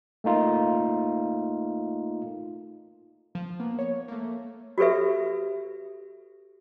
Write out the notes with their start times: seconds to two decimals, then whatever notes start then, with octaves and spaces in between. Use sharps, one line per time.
0.24 A3 A#3 D#4 F4
3.35 F3
3.59 A#3 B3
3.79 C#5
4.08 A3 A#3
4.78 F#4 G4 A4 B4 E5